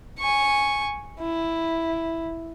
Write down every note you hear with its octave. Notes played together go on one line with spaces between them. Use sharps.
G#5 C#6
E4